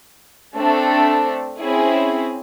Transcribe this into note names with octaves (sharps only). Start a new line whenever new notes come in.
A3 C4 D4 A4
C4 C#4 E4 G#4